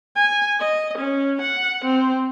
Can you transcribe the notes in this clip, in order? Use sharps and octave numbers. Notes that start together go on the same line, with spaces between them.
G#5
D#5
C#4
F#5
C4